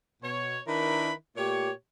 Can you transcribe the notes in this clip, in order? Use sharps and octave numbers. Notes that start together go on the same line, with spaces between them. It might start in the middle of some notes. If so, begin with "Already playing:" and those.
B2 C#5
D#3 D4 E4 A#4 B4 B5
A#2 A3 G4 C#5